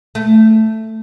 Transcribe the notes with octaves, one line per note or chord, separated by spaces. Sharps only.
A3